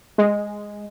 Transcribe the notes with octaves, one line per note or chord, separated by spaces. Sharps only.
G#3